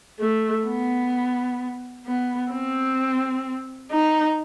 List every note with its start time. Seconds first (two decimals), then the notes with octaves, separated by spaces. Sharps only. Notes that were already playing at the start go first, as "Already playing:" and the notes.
0.19 A3
0.67 B3
2.06 B3
2.52 C4
3.91 D#4